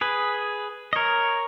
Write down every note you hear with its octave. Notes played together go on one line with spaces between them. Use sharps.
G#4 B4
D#5
A#4 C#5